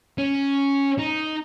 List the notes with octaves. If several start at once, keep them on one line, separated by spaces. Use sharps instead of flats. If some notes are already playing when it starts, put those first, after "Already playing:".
C#4
D#4